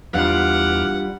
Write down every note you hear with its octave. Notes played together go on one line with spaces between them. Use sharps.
E2 G3 D4 F4 F#5 D6 F6